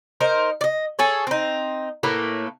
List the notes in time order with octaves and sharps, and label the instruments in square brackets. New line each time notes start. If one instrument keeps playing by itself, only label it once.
[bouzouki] D#4 A#4 C5
D5 D#5
G#4 A4 C#5
C4 D#4
A2 A3 A#3 B4